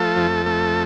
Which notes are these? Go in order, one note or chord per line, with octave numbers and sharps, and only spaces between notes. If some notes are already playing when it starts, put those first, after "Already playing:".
Already playing: F3 A3 A4
F2
A3